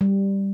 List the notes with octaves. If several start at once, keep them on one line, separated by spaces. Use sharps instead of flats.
G3